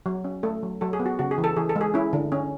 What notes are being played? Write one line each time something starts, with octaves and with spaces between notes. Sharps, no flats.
F#3
C#4
A3 A4
F#3
F#3 A4
G#4
B3
F#4
C#3 F#4
G#4
E3
A4
E3 G#4
A4
G#3 G#4
C#4 E4
D3
C#4